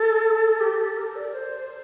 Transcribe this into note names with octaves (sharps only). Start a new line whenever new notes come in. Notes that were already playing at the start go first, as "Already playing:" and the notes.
Already playing: A4
G4
A4
A#4
D5
C5